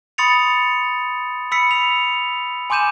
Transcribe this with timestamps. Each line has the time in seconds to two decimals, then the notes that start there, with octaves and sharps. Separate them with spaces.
0.18 B5 C6 D#6 A6 C#7 F7
1.52 B5 E6 B6 C#7
1.71 F7
2.70 G#5 C6 D6 G6 D#7 E7